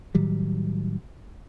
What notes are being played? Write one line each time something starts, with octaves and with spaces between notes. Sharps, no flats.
A2 D#3 F#3 G3